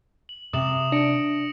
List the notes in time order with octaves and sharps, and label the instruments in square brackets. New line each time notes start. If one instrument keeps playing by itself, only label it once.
[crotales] F#7
[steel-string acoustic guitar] C3 [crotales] D#6 E7 F#7
[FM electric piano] D4 [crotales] A#6 C#7 D7